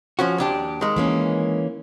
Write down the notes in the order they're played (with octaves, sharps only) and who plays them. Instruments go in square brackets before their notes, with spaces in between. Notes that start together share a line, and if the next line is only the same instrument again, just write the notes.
[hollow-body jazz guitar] F3 C#4 F#4
D#2 D4 G4
D#3 G#3
[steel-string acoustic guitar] E3 A#3 C#4